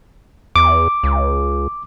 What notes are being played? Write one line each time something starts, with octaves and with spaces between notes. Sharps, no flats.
E2 D6
C#2